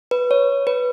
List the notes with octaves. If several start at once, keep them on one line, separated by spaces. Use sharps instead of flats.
B4
C#5
B4